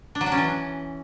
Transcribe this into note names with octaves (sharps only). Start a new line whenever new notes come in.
D4
F#3
D4
C#4
E3